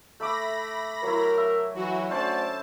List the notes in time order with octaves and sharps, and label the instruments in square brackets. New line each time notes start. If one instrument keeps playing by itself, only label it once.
[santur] A3 E5 D6 [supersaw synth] B5 A#6
[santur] F#3 E4 [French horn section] A#4
[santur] E5
[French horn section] E3 F#3 [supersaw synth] F#4
[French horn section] A3 F#4 D5 [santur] C#4 D4 C5 [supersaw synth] A5